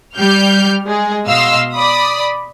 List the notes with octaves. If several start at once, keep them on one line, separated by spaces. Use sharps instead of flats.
G3 G4 F6 G6
G#3 G#4
B2 D#5 F5 C6 E6 F6
D5 B5 D#6